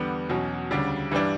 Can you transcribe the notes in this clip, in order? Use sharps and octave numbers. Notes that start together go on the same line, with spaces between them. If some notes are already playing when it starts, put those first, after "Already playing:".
Already playing: E2 D3 G3 B3
E2 B2 F#3 C#4
D2 C#3 G3 D4
G2 E3 G3 D4